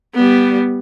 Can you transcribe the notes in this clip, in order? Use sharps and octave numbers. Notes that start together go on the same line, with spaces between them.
G3 B3